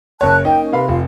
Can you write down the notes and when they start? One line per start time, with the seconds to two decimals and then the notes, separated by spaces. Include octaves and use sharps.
0.21 F#1 A#4 C#5 A5 F#6
0.45 A#3 D#4 G5
0.60 C#4
0.72 C3 A#4 B4 F5 B5
0.88 F1 F4 F5